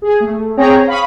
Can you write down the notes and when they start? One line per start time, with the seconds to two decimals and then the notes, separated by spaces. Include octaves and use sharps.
0.02 G#4
0.20 A3
0.57 C4 G#4 C#5 G5 A#5
0.87 F5 B5 C#6 D#6